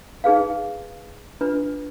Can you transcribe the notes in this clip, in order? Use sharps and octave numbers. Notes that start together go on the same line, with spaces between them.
D#4 G#4 B4 F5
D4 F4 B4